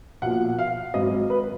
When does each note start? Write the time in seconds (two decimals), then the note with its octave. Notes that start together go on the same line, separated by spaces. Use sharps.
0.22 B1 A#2 F3 F#5
0.58 F5
0.94 G#1 G#2 F#3 D#5
1.30 B4